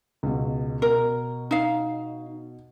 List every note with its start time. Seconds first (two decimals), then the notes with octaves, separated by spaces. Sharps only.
0.23 C#2 B2
0.82 B2 A#4
1.51 D#4 F5